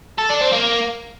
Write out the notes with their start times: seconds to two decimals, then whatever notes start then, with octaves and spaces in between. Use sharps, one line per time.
0.18 A4
0.30 D4
0.41 C4
0.53 A#3